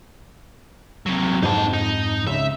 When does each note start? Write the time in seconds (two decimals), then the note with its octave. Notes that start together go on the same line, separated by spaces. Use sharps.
1.06 C3 F#3
1.42 F2 G#2 D#4 A5
1.73 D#4
2.27 C#2 E5